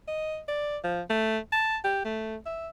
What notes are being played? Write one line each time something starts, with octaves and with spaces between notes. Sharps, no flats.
D#5
D5
F3
A3
A5
G4
A3
E5